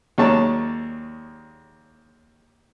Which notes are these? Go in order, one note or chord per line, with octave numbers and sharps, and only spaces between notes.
D#2 F#3 G#3 C#5 D5 A5